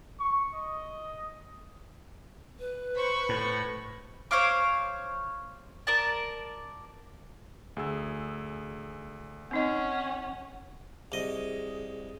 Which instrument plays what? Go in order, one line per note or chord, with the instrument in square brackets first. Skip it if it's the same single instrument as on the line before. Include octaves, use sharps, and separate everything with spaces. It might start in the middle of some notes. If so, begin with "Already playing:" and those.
[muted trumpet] C#6
D#5
[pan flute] B4
[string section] C5 B5 C#6
[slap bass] A2
[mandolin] C5 C#5 F5 D6
A#4 D5 A5
[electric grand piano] D2 G#4 E6
[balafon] C4 D#4 D#5 [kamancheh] C#4 F#5
[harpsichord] C2 D#5 [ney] G#4